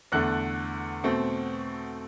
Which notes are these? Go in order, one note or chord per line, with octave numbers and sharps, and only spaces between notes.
E2 D3 A3 F#6
B2 A3 C4